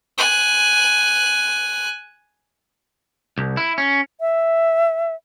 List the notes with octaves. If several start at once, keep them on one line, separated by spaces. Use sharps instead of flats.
G#5 F#6
C2
E4
C#4
E5